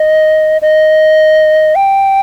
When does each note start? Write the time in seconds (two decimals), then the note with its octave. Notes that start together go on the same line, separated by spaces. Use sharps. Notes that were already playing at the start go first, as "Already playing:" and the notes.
Already playing: D#5
0.62 D#5
1.75 G5